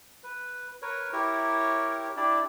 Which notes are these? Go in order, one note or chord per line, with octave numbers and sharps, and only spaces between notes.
B4
A#4 B4 C#5
E4 G4 A#4 C#5
D4 E4 G4 D5